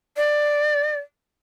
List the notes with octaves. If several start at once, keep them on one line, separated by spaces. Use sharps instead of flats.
D5